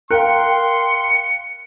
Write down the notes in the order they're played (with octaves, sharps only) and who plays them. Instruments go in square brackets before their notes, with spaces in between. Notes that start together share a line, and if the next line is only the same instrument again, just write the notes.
[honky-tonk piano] A#4 G5 [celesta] F5 F#6 [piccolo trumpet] C6 [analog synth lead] C#7